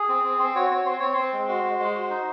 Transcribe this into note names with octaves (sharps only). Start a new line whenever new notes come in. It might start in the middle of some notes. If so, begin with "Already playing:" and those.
Already playing: G#4
C4
C4
C4 C5
F#4 C#5
C4 C#5
C4 C5
C4 C#5
C4 C5
G#3
F#4
G#3
G#3
F#4
D#4